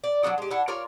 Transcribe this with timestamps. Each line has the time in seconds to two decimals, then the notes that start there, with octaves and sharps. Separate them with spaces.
0.04 D5
0.23 F#3 G#3 D4 F#4
0.38 G#3 G4
0.50 D4 E4 F#5
0.68 F4 A#4 C#5 D5